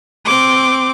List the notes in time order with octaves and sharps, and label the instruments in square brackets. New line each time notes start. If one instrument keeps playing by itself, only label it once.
[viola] C4 D6